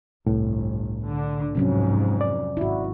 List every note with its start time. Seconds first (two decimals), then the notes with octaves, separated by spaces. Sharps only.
0.27 G1 C2 A2
1.05 D3
1.55 F2 G#2 C3 F#3 C#4
2.21 D5
2.57 G#1 E4 F#4